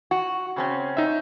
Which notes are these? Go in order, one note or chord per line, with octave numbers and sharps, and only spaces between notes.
F#4
C#3 C4 C#4
D#4 E5